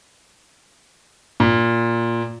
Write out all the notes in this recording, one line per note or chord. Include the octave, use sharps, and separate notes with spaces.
A#2